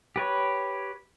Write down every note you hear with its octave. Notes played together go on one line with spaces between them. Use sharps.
G4 B4 C#5